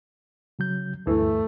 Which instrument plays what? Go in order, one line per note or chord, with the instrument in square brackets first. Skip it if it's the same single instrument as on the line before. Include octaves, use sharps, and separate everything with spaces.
[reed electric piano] C#3 F#3 G6
[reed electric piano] D2 G2 [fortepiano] E3 [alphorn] A3